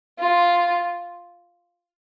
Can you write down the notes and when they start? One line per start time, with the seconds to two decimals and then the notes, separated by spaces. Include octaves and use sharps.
0.19 F4